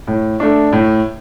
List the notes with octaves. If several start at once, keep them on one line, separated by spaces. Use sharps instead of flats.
A2
A3 D4
A2